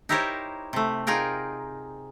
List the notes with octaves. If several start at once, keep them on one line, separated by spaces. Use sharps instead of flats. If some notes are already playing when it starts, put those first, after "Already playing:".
D#4 E4 G4 A#4 C5 C#5
C3 A3
D#4 F4 G#4 A#4 G5